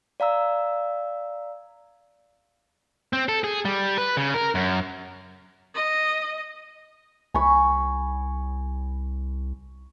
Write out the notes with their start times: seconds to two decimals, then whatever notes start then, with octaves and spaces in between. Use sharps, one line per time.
0.20 D5 F5 A#5 E6
3.13 C4
3.29 A4
3.44 G#4
3.65 G3
3.98 B4
4.17 C#3
4.34 A#4
4.55 F#2
5.74 D#5
7.34 C2 G#5 B5 C#6